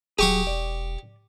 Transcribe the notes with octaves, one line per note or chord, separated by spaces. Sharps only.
D#1 F#3 G4 G#4 C#6 D#6
E1 D5